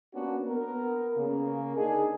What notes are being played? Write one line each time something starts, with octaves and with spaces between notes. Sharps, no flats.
A#3 B3 C#4 D4 F#4
B3 A#4
C#3 A#3
D3 D4 D#4 G#4